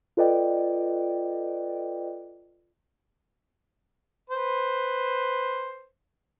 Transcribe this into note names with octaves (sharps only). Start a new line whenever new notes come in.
F4 A4 B4 D5 D#5 G5
B4 C5